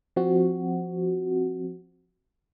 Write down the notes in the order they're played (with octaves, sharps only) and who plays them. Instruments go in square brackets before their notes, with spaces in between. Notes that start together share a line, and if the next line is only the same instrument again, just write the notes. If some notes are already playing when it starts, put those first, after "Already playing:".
[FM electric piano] F3 C4 F#4